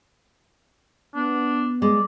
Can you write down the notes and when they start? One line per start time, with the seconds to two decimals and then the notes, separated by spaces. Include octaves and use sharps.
1.14 B3 D4
1.82 G#3 D5